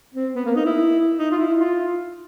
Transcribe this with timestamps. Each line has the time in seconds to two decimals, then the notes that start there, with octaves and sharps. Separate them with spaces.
0.15 C4
0.35 B3
0.46 A#3
0.56 D#4
0.66 E4
1.18 D#4
1.31 F4
1.38 E4
1.59 F4